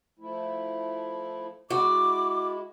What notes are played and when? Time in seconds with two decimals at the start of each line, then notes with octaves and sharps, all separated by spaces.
0.19 F3 A3 E4
1.71 G#3 E4 F#4 D6